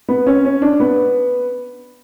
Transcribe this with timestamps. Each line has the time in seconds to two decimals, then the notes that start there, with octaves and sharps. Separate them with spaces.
0.09 B3
0.27 C#4
0.45 C#4
0.62 D4
0.80 B3